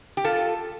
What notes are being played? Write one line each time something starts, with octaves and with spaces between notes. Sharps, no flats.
G4
F4 A4